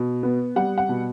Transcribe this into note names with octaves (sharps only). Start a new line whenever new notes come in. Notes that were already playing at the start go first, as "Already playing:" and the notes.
Already playing: B2
B3
G3 F#5
F#5
B2